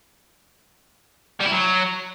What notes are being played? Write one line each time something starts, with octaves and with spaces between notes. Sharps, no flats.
G3
E4
F#3